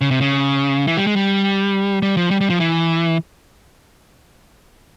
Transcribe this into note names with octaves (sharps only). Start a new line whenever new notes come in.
C#3
C3
C#3
E3
G3
G#3
G3
G3
F3
G3
G3
F3
E3